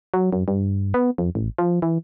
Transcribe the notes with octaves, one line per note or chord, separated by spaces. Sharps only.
F#3
F#2
G2
B3
F2
A1
F3
E3